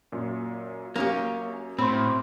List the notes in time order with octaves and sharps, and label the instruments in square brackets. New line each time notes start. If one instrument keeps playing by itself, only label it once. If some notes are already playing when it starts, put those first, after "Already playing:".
[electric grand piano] F#2 A#2
[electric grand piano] F#2 [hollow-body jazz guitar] A#3 C#4 G4
[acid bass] A2 [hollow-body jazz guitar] C4 [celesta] B5 C6